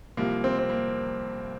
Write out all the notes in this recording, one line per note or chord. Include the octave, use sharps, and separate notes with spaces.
C2 C3 F3 A#3
C4
C4
A#3